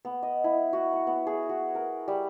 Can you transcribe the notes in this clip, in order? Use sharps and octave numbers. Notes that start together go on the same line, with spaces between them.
B3
D#5
E4
F#4
C#6
B3
G#4
F#4
A#4
G3